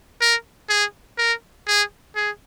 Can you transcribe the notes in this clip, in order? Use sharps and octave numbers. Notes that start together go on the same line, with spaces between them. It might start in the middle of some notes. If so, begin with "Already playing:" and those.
A#4
G#4
A#4
G#4
G#4